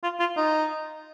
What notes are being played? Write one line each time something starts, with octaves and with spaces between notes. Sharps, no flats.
F4
F4
D#4